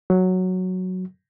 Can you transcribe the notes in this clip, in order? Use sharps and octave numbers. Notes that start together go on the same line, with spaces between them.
F#3